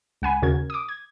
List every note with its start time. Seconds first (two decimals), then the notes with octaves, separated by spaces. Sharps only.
0.22 C#2 F#5 G#5 B5
0.42 D#2 C#3 F#4 A#4 G#6
0.70 D6 D#6
0.89 G#6